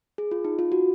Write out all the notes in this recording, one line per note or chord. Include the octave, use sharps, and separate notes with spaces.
G#4
F4
D#4
F4
F#4